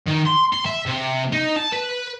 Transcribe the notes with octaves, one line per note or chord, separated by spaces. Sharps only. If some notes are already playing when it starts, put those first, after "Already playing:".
D#3
C6
C6
E5
C3
D#4
A5
B4